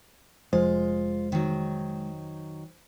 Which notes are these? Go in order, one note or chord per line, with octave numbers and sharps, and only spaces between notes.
F1 F3 G#3 F4 C5
D#3 F#3